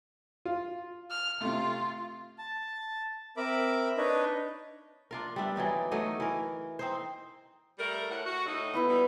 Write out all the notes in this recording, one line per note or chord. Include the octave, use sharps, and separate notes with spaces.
F4
F6
C3 A3 F4
A5
C4 A#4 E5 B5 D6
D4 D#4 B4 C#5 D#5
D4 F4 A#4
G3 B3 D4 E5
E3 F#3 D#4 D5
F#3 A3 D#4 D#5
E3 A#4
C4 D#4 C5
G3 A3 A#4
A2 F#5
F#4
A2 D#4 E6
B3 E4 B4
B2 G3 D#4